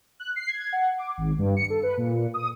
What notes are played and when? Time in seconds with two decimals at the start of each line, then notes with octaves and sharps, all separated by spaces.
0.20 F#6
0.36 C7
0.49 G#6
0.73 F#5
0.98 D6
1.17 G#1
1.38 G2
1.57 C#7
1.70 A4
1.83 B4
1.97 A#2
2.34 D#6